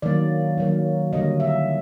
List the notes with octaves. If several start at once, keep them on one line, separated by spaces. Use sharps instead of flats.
D#3 F#3 A#3 D5
D#3 F#3 A#3
D3 G3 A#3 D#5
E5